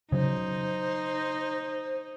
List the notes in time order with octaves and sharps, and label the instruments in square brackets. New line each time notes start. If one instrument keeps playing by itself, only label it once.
[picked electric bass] C#3 F#3 [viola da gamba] D#4 [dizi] C5